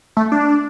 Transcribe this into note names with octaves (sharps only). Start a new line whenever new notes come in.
A3
D4